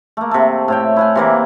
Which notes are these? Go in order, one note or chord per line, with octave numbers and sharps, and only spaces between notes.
A3 A#3
C3 A3
A2 C#5 G5
E4 F#5 G#5
C3 E3 A#3